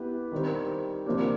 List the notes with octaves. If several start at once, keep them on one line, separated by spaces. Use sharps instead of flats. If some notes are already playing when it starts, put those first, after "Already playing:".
Already playing: B3 E4 G4 B4
D#3 G3 C4
C3 F3 A#3 D4 G4